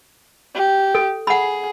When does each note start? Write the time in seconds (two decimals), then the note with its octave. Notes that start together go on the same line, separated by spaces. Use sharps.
0.55 G4
0.95 A4
1.27 G#4 F#5 B5